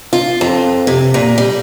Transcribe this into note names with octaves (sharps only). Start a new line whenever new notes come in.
F4
F2
C3
A#2
G3